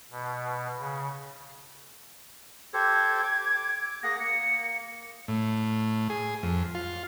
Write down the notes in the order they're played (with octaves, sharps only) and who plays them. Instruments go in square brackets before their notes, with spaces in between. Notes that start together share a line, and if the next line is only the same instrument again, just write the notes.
[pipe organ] B2
C#3
[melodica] G4 A4 C5 [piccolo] G#6
[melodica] D6
D6
[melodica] A#3 G#4 F#5 [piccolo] A#6
[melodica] A#3 [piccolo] C#7
[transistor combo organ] A2
G#4
F2
F4